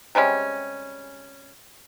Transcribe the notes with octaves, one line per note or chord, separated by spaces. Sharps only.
C3 G3 G#3 C#4